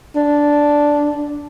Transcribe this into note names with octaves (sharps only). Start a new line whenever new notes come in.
D4